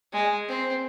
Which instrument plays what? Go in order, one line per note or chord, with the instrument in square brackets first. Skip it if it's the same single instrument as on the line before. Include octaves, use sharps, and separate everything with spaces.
[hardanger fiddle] G#3
C4